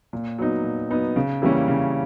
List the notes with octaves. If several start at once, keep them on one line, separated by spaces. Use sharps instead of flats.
A#2
F#3 B3 D#4
A#2
F#3 B3 D#4
C#3
E3 G3 A#3 C#4
C#3